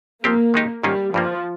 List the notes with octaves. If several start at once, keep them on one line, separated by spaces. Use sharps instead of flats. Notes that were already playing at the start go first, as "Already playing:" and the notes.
F3 A#3 C4 G4
D#3 G#3 D#4 G4
G#2 D#3 G3 A#3 C#4 F4
G2 F3 G3 A#3